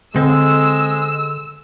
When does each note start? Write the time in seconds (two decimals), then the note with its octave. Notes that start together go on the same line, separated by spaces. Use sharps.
0.16 D3 G#3 C4 E6